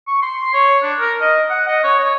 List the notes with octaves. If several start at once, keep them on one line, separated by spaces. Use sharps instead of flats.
C#6
C6
C#5
D4
A#4
D#5
F#5
D#5
C#5
C#5